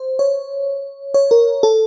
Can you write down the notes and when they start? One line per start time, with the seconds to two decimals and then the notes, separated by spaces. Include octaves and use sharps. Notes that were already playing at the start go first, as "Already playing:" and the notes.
Already playing: C5
0.19 C#5
1.14 C#5
1.31 A#4
1.63 A4